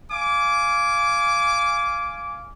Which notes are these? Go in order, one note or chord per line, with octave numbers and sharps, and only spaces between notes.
F5 G#5 D6